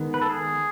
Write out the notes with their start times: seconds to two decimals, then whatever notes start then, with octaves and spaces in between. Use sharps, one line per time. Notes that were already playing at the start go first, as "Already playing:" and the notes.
Already playing: D#3 G#3 B3
0.14 B4
0.22 A4
0.29 G#4